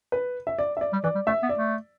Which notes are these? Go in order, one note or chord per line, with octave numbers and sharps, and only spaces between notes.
B4
E5
D5
E5
D5
G3
E3 D5
G3
A3 E5
B3
D5
A3